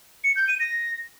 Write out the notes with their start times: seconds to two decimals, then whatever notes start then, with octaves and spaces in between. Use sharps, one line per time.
0.24 C#7
0.36 G6
0.48 D#7
0.60 A#6